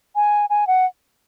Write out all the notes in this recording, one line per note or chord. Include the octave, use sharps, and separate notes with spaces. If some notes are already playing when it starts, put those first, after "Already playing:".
G#5
G#5
F#5